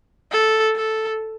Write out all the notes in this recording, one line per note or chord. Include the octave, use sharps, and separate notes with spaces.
A4
A4